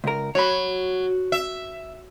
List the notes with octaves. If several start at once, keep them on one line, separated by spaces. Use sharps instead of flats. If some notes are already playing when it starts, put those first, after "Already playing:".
C#2 A#4
F#3 C#5 B5
E5